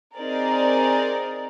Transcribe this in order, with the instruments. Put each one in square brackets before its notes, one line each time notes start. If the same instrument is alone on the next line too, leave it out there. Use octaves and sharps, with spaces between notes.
[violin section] C4 D#4 G#4 A#4 D5